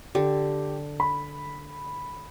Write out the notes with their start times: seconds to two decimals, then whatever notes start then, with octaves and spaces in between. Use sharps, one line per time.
0.15 D3 G4
1.00 B5